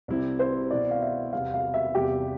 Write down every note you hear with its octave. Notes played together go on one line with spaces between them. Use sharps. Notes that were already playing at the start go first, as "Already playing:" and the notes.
C2 C3 G3 C4 E4
C5
B2 B3 E4 D5
F5
E5
E2 C3 G3 B3 F5
F5
E5
E2 C3 G3 B3 G4